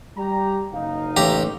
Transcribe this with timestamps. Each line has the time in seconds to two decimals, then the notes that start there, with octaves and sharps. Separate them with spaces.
0.17 G3 G4 A#5
0.73 F#1 D#4 F5
1.17 A1 G4 A#5